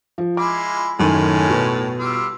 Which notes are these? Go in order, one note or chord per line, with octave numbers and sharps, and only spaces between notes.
F3
G#3 E4 F4 D6
F#2 A2 D#3 G#3 C#4
B2
G3 F4 E6